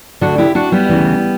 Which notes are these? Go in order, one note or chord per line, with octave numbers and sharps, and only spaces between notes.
D2 D3 D4 F#4
E4 G4
D4 F#4
G3 B3
D2 C#3 E3